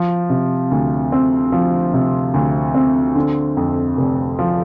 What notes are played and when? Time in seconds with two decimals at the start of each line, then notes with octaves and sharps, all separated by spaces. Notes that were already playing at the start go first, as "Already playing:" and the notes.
Already playing: F3
0.29 C3
0.71 D2
1.12 C4
1.52 F3
1.93 C3
2.34 D2
2.75 C4
3.15 D3
3.57 F2
3.97 F1
4.39 F3